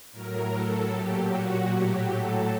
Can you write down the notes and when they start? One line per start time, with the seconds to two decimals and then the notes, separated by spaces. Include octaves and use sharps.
0.12 A2 F#3 A#4
0.51 A4
0.90 A#2 F#3 G4
1.30 F#4
1.69 A2 F#3 G4
2.09 A4